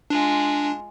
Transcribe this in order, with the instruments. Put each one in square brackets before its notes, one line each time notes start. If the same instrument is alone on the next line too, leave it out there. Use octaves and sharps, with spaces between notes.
[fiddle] G#3 F4 [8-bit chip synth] D4